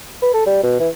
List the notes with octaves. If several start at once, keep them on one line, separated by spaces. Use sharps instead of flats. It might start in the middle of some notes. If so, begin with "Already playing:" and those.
B4
A4
G3
B2
E3